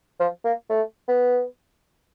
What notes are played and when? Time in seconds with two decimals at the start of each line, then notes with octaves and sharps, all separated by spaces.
0.20 F3
0.45 A#3
0.70 A3
1.08 B3